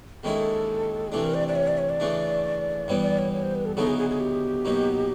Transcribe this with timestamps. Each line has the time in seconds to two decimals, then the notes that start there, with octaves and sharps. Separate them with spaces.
0.23 D#2 D#3 G#3 C#4 E4 A4
1.07 G#4
1.12 C3 E3 A3 D4 A4
1.23 A#4
1.34 D5
1.48 D5
1.56 C#5
1.68 D5
1.78 C#5
1.90 D5
2.00 C#3 E3 A3 D4
2.88 G2 E3 G3 B3 C#5
2.99 C#5
3.03 D5
3.18 C#5
3.33 C#5
3.43 C5
3.55 B4
3.65 A4
3.76 D2 C#3 F#3 B3 D#4 A4
3.87 G#4
3.99 G#4
4.10 G#4
4.20 G4
4.65 B2 F#3 A#3 D#4